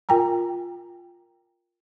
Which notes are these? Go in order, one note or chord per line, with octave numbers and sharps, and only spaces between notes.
F4 A#4 G5 G#5 A#5